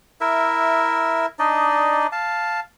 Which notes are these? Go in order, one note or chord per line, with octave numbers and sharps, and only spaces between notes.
E4 A#4 E5
D4 D#4 D5 D#5
F5 A5